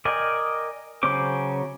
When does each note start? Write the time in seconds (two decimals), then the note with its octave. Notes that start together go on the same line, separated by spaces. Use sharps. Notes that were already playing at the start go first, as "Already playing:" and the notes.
0.05 A#4 D5 D#5 G5 G#5
1.03 C#3 F#3 C#4 C5 D6